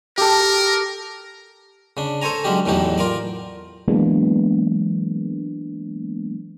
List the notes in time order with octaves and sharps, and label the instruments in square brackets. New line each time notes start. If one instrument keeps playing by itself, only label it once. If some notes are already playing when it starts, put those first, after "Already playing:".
[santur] G4 A4 [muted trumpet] A#4
[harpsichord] C#3 D4
A4 C5 C#5 G#5 A#5
F#3 G#3 C#4 D4 G4
E2 A2 E3 F#3 D#4 G4
F4 A#4 D5
[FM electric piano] E3 F#3 G#3 A#3 B3 D4